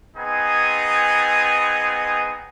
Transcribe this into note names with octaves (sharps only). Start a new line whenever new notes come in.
B3 C4 D#4 G#4 G#5